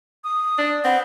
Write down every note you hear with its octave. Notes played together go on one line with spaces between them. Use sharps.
D#6
D4
C4 B4 F#5